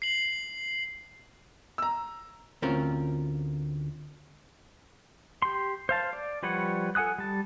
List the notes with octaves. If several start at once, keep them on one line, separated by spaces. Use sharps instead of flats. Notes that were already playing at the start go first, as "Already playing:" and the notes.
C7 F#7
A#5 E6
D2 C4 C#4 F4 A#4
G4 C6
C5 F5 A5
D5
F3 G3 B4 C#5 F#5
A4 F#5 G#5 D#6 F#6
G3 A5